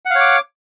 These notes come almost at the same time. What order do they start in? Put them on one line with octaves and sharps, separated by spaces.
F#5 F5 C#5 D6